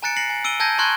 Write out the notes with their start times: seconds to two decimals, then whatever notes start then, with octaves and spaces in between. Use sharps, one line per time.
0.03 G#5 A#5 F#6 A6 C#7 D7
0.16 A#6 C7 C#7 F#7
0.30 G#5
0.44 E6 D7 D#7 G7
0.60 A5 E6 G6 G#6 A#6
0.78 A5 A#5 C6 C#6 F#6 G#6